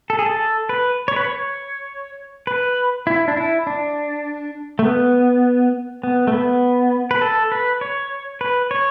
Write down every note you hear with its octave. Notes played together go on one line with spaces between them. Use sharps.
A4
G#4
A4
B4
C#5
B4
C#5
B4
E4
D4
E4
D4
A3
B3
B3
A3
B3
B4
A4
B4
C#5
B4
C#5